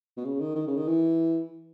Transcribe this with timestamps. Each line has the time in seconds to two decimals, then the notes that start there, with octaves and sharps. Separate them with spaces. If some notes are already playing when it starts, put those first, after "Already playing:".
0.17 B2
0.25 C#3
0.40 D#3
0.56 D#3
0.67 C#3
0.77 D#3
0.87 E3